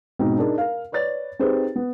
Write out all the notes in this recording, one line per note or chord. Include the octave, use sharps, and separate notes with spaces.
G#2 B2 G#3 C4 D#4
D4 D#4 G#4 A#4
A#4 F5
B4 C#5 D5 A6
C4 D#4 G4 G#4 B4 C5
B3